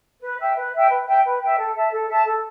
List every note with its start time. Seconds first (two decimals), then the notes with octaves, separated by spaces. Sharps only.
0.21 B4
0.39 E5 G5
0.56 B4
0.73 E5 G5
0.89 B4
1.06 E5 G5
1.24 B4
1.40 E5 G5
1.57 A4
1.75 E5 A5
1.91 A4
2.08 E5 A5
2.25 A4